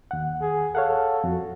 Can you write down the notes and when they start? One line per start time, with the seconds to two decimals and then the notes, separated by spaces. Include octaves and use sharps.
0.11 D#2 F#5
0.41 G#4
0.75 A4 C#5 F5 F#5
1.24 F2 F#4